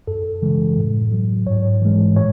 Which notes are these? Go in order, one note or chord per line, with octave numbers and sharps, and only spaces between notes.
F#2 A4
C#3 E3 G#3
A2
F#3
G#2 C#5
E3 G#3
A2 C#5